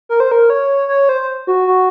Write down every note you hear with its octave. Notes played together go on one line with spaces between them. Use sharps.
A#4
C5
A#4
C#5
C#5
C5
F#4
F#4